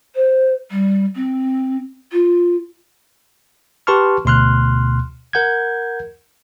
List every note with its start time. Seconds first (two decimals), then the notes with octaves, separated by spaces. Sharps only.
0.15 C5
0.71 G3
1.15 C4
2.12 F4
3.87 G4 B4 A5 C6 C#6 F6
4.25 D2 B2 C6 F6 F#6
5.33 A#4 F#5 G6 G#6